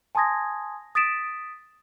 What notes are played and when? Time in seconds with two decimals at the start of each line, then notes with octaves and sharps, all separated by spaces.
0.15 G#5 A5 C6 D#6 G#6 A#6
0.95 D#6 A6 B6 D7 E7